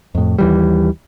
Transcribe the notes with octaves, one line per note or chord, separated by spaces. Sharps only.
F2 A2
D#2 E3 G3